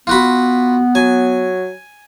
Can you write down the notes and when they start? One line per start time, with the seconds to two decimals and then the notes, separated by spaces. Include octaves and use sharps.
0.07 B3 F4 F#4 B5
0.95 F#3 G#5